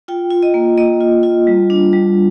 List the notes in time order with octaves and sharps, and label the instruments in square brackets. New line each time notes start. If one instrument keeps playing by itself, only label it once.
[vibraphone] F4 G5
F4
D#5
A#3
A#3 D#5
F4
F4
G3
D4
G3